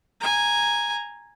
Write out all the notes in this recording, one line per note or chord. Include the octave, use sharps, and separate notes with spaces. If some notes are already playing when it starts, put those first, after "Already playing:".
G#5 A#5